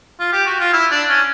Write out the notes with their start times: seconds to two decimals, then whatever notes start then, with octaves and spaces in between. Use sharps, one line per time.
0.20 F4
0.33 G4
0.46 F#4
0.60 F4
0.73 E4
0.91 D4
1.09 C#4